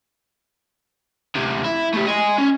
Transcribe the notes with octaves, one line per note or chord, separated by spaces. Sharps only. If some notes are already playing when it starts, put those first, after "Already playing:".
D2 C3
E4
A3 G4
D#5 G#5
C#4